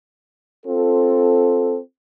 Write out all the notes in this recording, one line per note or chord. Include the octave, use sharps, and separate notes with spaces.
C4 F4 A4